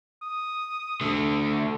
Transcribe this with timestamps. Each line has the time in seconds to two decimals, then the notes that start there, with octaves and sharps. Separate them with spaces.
0.22 D#6
1.01 D3 A3